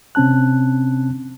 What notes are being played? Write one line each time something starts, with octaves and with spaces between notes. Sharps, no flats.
C3 C4 C#4 A5 F#6